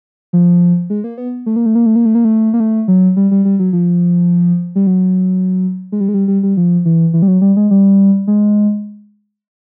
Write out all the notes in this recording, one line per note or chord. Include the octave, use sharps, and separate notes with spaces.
F3
G#3
A#3
B3
A3
A#3
A3
A#3
A3
A#3
A3
A#3
A3
A#3
A3
F#3
G3
G3
G3
F#3
F3
G3
F#3
G#3
G3
G#3
G3
G3
G3
F3
E3
E3
G3
F#3
G3
G#3
G3
G#3